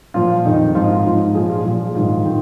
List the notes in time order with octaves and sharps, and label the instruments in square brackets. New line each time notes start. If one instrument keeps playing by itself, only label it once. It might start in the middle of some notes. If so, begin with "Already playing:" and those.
[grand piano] A#2 F3 F4
F2 D#3 D#4
D#4
G#2 F3 F4
G#2 F3
A#2 F3 G#4
F4
A#2 F3 G#4
G#2 D#3 F4
D#3